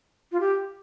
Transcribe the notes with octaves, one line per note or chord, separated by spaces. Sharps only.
F4
G4